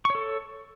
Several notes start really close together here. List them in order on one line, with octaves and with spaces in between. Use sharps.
C#6 C#5 A4